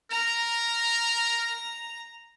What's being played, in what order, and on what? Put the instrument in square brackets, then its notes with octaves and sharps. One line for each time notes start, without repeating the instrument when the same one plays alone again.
[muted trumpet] A#4 [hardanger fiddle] A#5